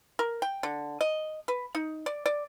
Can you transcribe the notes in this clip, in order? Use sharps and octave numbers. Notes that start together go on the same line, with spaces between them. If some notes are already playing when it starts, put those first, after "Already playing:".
A#4
G5
D3
D#5
B4
D#4
D5
D5